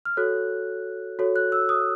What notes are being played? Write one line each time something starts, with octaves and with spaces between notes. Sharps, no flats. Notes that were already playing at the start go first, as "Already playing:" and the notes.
F6
F#4 A4 C#5 F#6
F#4 A4 C#5
F#6
E6
D#6